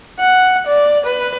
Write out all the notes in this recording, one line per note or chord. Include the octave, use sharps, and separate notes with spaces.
F#5
D5
B4